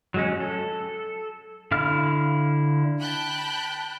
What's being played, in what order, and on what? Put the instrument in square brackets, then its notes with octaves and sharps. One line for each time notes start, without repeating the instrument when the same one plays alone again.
[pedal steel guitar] F#3 G#3 C#4
A4
D3 E4 F5 F6
[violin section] G5 A5 B5 F#6 G6